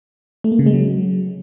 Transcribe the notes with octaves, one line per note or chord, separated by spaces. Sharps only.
A3
A#3
C#3
G#3
F#3